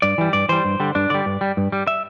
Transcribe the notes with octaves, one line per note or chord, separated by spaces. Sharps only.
G2 D5
E3 G3
G2 D5
E3 G3 C5
G2
D3 G3
G2 D4
D3 G3 D5
G2
G3
G2
G3
E5